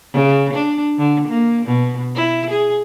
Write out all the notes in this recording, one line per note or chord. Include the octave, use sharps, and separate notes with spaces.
C#3
D4
D3
A#3
B2
E4
G#4